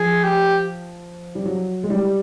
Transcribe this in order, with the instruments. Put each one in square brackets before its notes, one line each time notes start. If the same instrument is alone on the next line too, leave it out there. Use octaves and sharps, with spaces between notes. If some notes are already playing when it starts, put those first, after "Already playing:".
Already playing: [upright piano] F3 [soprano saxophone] G#4
[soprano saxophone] G4
[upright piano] G3
F#3
G#3
G3